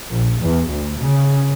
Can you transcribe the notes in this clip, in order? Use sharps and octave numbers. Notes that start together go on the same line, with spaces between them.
A#1
E2
D2
C#3